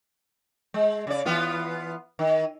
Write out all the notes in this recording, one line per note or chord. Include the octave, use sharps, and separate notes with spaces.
G#3
C#3 D5
E3 B3 F4
D#3